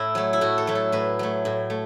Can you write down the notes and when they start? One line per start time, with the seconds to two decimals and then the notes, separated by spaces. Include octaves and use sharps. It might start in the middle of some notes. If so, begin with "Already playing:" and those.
Already playing: A2 E4
0.15 F#3 A3
0.33 E4
0.41 A2 F#4
0.58 A4
0.67 F#3 A3
0.75 A4
0.92 A2 B4
1.19 F#3 A3
1.45 A2
1.70 A3